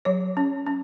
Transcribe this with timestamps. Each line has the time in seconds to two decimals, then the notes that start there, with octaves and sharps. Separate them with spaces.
0.05 F#3 C#5
0.37 C#4
0.66 C#4